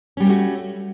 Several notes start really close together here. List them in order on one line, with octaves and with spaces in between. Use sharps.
C#4 G3 G4 A3 F#4